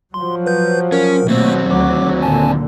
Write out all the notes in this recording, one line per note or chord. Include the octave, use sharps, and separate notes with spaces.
F3 F#3 C6
B4 G6
C#4 A#4
D#2 B2 F#3 A3 A#3 C4
D2 F#3 D6
A#2 D3 G#5 A5